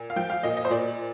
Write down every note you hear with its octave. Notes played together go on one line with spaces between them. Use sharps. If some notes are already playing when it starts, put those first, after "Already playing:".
Already playing: A#2
F5
F3 G5
F5
A#2 D#5
D#5
C5
A#2 D5